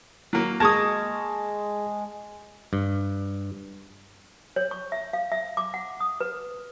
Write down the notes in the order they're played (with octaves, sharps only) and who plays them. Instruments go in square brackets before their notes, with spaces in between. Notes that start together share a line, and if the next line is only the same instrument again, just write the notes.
[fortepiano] F#3 A#3
[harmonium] G#3 [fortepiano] A#3 [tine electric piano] G#4 G#6 A#6 [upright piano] A5 C#6 D#6
[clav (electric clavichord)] G2
[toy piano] C#5
C#6
E5
F5
E5
D6
F#5
D#6
B4